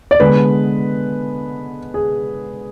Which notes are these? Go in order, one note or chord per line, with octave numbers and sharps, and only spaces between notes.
D5
D3 G#3 B3 B4
G#4